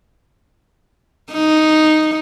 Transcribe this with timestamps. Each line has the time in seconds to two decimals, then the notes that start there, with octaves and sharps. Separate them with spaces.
1.33 D#4